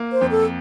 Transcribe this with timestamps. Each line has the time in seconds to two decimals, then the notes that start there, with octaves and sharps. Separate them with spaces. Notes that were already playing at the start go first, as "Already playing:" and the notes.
Already playing: A#3
0.12 C5
0.21 F2
0.31 A4